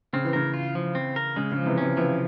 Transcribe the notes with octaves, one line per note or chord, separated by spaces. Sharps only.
C#3 C4
E3
C#3 A#4
F4
F3
C4
A#4
C#3 G#3
C#3 F3
C3 E3
C3 E3 C#4
C3 E3 F3